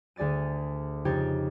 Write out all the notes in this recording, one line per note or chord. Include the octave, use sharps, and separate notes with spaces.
D2 G#4 D5 A6 D#7
F2 C#3 D#4 G4 G#6 A6